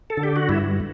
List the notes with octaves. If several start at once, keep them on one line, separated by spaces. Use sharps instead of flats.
A4
D3
G4
F#4
G2 E4